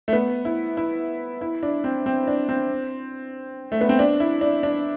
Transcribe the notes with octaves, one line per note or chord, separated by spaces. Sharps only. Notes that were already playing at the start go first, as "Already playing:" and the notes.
A3
B3
E4
E4
E4
D4
C4
C4
D4
C4
A3
B3
C4
D4
E4
D4
D4